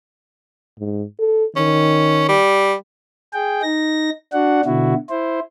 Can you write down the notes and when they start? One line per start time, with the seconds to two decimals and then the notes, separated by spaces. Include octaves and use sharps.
0.79 G#2
1.19 A4
1.56 D#3 C#4
2.29 G3
3.33 G#4 G5
3.63 D#4 A#6
4.33 D4 F#4 F#5
4.65 B2 D3 E4 F#4
5.10 E4 C5